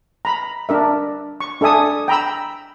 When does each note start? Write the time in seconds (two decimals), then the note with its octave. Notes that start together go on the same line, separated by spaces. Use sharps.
0.25 A#5 B5
0.69 D4 A#4 E5
1.40 C#6
1.61 D4 A4 E5 G#5 D#6
2.08 G5 A#5 B5 E6